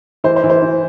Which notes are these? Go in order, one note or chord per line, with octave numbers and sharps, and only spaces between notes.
E3 C5
C5
E3
C5
E3